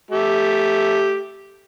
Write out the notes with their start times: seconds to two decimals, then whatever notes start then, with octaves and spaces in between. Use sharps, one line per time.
0.11 A3 G4